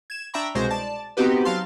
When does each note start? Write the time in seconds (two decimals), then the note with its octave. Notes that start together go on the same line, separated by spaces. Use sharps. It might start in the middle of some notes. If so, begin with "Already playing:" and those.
0.10 G#6 E7
0.34 D4 E5 G5 A#5 B5 C#6
0.55 C2 B2 G#3 C5 C#6 A#6
0.71 D5 A5
1.17 B3 C4 D#4 F#4 G4 B4
1.45 F#3 F5 A5 C6